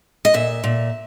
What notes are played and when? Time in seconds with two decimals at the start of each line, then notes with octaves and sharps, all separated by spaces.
0.25 D#5
0.34 A#2 E5
0.64 A#2